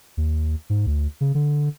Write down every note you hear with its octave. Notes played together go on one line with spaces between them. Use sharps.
D#2
G#2
D2
C#3
D3